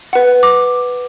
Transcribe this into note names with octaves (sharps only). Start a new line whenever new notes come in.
B4 F#5
D6